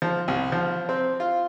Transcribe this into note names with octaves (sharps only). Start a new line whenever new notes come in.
F3
C2
F3
C4
F4